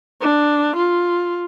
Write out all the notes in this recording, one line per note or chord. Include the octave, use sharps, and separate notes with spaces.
D4
F4